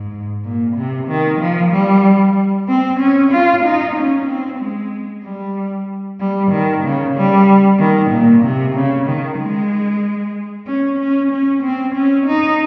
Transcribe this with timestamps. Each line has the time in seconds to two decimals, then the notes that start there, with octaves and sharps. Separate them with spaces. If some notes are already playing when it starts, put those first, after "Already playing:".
Already playing: G#2
0.44 A#2
0.76 C3
1.08 D#3
1.40 F3
1.72 G3
2.68 C4
3.00 C#4
3.32 F4
3.64 D#4
3.96 C#4
4.27 C4
4.60 G#3
5.24 G3
6.20 G3
6.51 D#3
6.84 C#3
7.15 G3
7.79 D#3
8.11 A#2
8.43 C3
8.75 C#3
9.07 D#3
9.39 G#3
10.67 C#4
10.99 C#4
11.31 C#4
11.63 C4
11.95 C#4
12.27 D#4